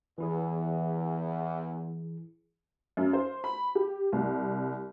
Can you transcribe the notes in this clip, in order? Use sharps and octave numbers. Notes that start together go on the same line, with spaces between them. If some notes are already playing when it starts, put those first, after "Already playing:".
E2 E3 E4 G#4
F#2
C5
B5
G4
C2